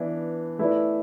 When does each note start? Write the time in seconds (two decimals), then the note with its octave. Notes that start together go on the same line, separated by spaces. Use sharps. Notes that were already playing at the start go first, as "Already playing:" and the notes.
Already playing: E3 B3 D4
0.59 A3 E4 B4 D5